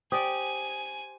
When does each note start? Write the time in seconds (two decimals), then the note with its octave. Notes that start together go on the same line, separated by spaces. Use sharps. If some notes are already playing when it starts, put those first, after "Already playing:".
0.12 G4 C5 D5 G5 G#5 D#6